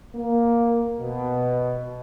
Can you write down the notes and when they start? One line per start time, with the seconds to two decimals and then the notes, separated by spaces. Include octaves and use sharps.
0.15 A#3
1.01 B2